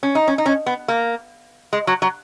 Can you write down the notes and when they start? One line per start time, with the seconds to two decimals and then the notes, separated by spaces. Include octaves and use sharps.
0.03 C#4
0.15 D#4
0.28 C#4
0.38 D#4
0.46 C#4
0.66 B3
0.88 A#3
1.73 G#3
1.87 F#3
2.02 F#3